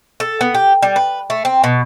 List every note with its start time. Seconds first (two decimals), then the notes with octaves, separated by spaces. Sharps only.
0.20 A4
0.41 B3
0.54 G4
0.82 G3
0.96 B4
1.30 A3
1.45 C4
1.64 B2